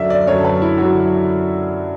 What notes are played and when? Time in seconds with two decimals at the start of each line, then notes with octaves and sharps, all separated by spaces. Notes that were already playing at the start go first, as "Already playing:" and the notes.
Already playing: F#2 D3 F#3 D5 E5
0.10 D5
0.27 F#2 D3 F#3 C#5
0.38 A4
0.45 B4
0.62 E4
0.78 D3 F#3 F#4